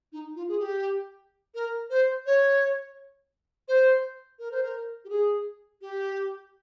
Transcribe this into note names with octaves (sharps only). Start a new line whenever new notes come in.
D#4
F4
G#4
G4
A#4
C5
C#5
C5
A#4
C5
A#4
G4
G#4
G4